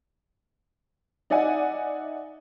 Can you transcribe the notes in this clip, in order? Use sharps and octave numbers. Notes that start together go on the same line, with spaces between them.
D#4 D5 E5 F#5 G#5